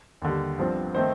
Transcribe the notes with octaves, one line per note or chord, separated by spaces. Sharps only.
D#2 D3 G3
G1 G2 F3 C4
D#3 A3 C4 C5